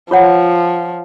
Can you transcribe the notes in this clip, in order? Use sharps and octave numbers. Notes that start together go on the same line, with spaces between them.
F3 F4 C#5 F#5